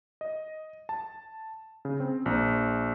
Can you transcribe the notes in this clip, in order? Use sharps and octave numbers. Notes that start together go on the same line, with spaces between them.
D#5
A5
C#3
C4
A#1